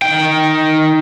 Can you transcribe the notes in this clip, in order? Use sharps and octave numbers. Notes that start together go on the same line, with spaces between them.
D#3 G5